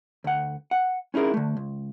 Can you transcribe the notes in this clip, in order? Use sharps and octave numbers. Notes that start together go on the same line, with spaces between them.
D2 F#5
F#5
C#4 D#4 E4 G#4 A#4
D3 A3
C#2